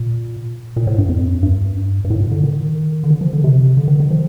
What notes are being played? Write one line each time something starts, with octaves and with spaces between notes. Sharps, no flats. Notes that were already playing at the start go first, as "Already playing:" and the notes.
Already playing: A#2
A#2
A2
G2
F2
G2
G2
A2
A#2
D3
D#3
D3
D#3
F3
D3
C3
D3
D#3
D#3
F3